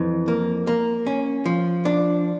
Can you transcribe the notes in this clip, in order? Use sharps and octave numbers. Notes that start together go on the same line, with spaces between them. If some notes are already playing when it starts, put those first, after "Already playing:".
Already playing: F2 E3
A#3
A#3
C#4
F3
D4